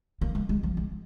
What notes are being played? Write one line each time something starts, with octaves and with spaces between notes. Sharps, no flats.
A#3
G#3
G#3
F3
G#3